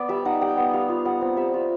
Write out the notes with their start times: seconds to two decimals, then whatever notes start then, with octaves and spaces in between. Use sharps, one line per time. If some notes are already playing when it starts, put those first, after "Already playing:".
Already playing: B3 D5
0.09 G3 E5
0.25 D#4 F#5
0.41 G3 G5
0.57 B3 F#5
0.73 G3 F5
0.89 F4
1.05 G3 F#5
1.21 C4
1.37 G3 E5
1.54 F4